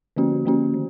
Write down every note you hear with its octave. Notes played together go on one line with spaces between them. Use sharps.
D3 F3 A#3 C#4 F#4
D3 F3 A#3 C#4 F#4
D#3